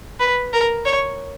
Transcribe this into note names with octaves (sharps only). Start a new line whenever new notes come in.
B4
A#4
C#5